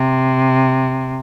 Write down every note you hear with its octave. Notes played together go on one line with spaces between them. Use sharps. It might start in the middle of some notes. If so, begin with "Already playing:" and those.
Already playing: C3